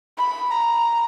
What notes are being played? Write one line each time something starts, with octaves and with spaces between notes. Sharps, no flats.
B5
A#5